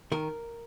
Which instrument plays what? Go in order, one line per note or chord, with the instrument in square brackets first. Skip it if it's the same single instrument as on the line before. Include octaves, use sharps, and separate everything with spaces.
[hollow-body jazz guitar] D#3 A#4